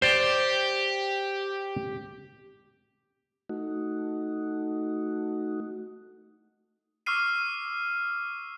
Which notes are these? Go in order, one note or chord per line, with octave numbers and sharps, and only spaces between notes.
G4 C5 D5
A3 D#4 F#4
C#6 D6 E6 F6 C7 D#7